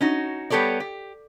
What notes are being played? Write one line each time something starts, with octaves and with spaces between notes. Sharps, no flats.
C#4 D#4 F#4
G3 B3 G4 A4 C#5 D5
G4